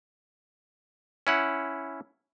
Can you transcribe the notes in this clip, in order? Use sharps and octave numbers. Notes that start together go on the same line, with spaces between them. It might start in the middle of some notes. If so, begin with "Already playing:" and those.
C#4 E4 F#5